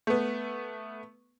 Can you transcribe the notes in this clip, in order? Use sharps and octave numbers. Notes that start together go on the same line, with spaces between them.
A3 B3